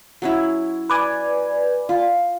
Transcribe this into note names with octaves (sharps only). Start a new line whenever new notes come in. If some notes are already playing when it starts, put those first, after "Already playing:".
F#3 C#4 E4
B4 D5 G#5
F4